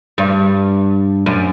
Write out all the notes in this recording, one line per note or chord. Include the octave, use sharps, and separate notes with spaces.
G2
F#2